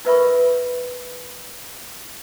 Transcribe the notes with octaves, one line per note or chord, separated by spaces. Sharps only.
D#4 A#4 B4 E5 B5 C#6